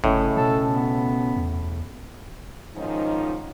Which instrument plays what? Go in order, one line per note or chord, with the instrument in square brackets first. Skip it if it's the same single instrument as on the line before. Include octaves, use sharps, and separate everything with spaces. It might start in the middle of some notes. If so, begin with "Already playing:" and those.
[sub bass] G1 [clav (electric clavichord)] A2 [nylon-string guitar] C#3 C#4 D#5
[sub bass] B2 [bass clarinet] A4
[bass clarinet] B3
[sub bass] E2
[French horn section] G#2 D#3 F3 C#4 D#4